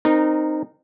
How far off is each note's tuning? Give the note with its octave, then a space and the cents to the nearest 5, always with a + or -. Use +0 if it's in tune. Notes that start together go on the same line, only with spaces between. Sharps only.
C4 +0 D#4 -15 A#4 +10